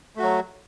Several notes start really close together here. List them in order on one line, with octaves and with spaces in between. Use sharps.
A3 F#4 F#3